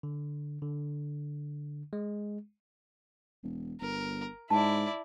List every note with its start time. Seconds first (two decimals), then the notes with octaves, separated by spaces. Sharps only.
0.03 D3
0.62 D3
1.93 G#3
3.43 E1
3.81 G1 A#4
4.50 G#2 E4 D5 A5